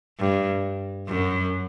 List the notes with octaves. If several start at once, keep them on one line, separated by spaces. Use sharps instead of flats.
G2
F#2